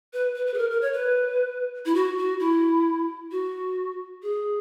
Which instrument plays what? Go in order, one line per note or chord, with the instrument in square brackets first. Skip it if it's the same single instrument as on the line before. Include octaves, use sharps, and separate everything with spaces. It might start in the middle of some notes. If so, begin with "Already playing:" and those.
[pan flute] B4
B4
B4
G#4
A#4
A#4
C#5
B4
E4
F#4
F#4
E4
F#4
G#4